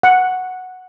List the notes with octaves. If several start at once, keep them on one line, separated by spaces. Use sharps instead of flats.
F#5